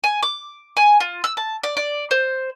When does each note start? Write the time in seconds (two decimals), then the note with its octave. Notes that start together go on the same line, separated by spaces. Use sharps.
0.04 G#5
0.23 D6
0.77 G#5
1.00 F4
1.24 E6
1.37 A5
1.63 D5
1.77 D5
2.11 C5